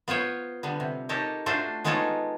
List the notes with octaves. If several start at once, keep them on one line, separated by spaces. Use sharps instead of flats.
B3 F4 C5 C#5
D3 G3 B3
C3
D#4 G4 A4 A#4 C#5
A3 D4 F4 F#4 A4 C5
G#3 B3 D#4 F4 A4 C#5